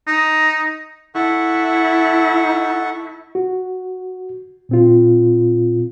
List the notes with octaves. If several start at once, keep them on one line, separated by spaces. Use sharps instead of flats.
D#4
E4 A4 F#5 C#6
F#4
A#2 C4 F4